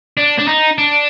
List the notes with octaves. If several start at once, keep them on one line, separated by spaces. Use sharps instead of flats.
D4
D4
D#4
D4